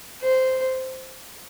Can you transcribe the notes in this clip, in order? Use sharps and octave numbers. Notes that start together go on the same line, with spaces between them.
C5